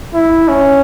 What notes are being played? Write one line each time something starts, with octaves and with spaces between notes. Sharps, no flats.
E4
C#4